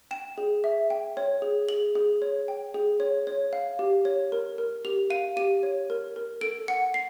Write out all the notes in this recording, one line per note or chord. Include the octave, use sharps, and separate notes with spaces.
G5 E7
G#4
E5
G5
C#5
G#4
G#4 F#7
G#4
C#5
G5
G#4
C#5
C#5
F5
G4
C#5
A#4
A#4
G4 F7
F5 D#7
G4 D#7
C#5
A#4
A#4
A4 D7
F#5 C#7
C7